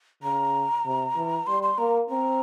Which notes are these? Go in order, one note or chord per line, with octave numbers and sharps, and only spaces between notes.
C#3 A#5
C3
E3
G3 C6
C6
A#3 A#5
C4 A#5